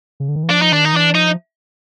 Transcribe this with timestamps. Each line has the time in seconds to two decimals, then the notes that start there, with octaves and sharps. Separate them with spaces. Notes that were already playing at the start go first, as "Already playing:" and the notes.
0.20 C#3
0.28 D3
0.35 D#3
0.43 E3
0.50 F3 D4
0.62 D#4
0.72 D#3 D4
0.85 D#4
0.93 E3 D4
1.14 F3 D#4